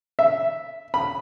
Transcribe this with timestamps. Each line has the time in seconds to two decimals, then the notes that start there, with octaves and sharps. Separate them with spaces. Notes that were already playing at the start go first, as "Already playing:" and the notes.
0.19 E5
0.94 B5